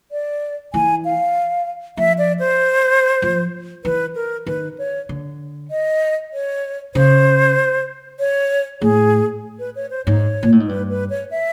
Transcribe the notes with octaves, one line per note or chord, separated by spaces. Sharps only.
D5
E3 G#5
F5
F3 E5
D5
C5
F3
E3 B4
A#4
D#3 B4
C#5
D3
D#5
C#5
C#3 C5
C#5
A2 G#4
B4
C#5
C5
G#2 C#5
A#2
A2
G#2
G2 B4
B4
C#5
E5